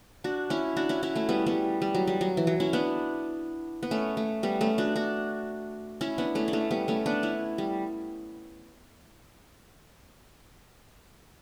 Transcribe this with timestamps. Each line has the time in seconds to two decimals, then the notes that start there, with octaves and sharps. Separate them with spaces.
0.24 D4 F#4
0.50 C#4 E4
0.76 D4 F#4
0.89 C#4 E4
1.03 C#4 E4
1.15 A3 C#4
1.29 G3 B3
1.47 G3 B3
1.82 G3
1.95 F#3
2.07 G3
2.21 F#3
2.37 E3
2.47 F#3
2.60 C#4 E4
2.73 B3 D4
3.83 B3
3.91 A3 C#4
4.17 A3
4.43 G3 B3
4.61 A3 C#4
4.78 D4 F#4
4.96 D4 F#4
6.01 C#4 E4
6.18 B3 D4
6.35 A3 C#4
6.48 D4
6.53 A3 C#4
6.71 G3 B3
6.88 A3 C#4
7.06 B3 D4
7.23 C#4 E4
7.58 G3